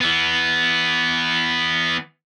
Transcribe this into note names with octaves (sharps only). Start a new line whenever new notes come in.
E3 B3